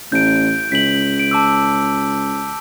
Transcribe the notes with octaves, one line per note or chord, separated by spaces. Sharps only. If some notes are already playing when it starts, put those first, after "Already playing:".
A1 G6 D7
C#2 B6 F#7
D7
A5 D6 E6